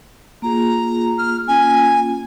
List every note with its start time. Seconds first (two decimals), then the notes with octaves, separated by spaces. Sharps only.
0.42 A#3 F4 G#4 A#5
1.18 F6
1.48 A#3 C#4 F4 G#5